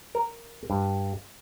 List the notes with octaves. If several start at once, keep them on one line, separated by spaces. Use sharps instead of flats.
A#4
G2